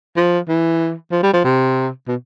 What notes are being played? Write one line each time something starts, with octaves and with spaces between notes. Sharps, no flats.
F3
E3
F3
G3
F3
C3
B2